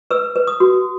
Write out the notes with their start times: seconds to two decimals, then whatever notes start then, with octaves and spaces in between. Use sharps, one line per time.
0.11 B4 E6
0.36 B4
0.47 D#6
0.60 F#4